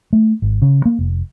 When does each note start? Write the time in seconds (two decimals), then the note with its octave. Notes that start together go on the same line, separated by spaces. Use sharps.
0.13 A3
0.42 G#1
0.62 C#3
0.85 A#3
0.99 F1